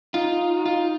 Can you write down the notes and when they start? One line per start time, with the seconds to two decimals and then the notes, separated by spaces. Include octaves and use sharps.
0.14 D#4 F4
0.66 F4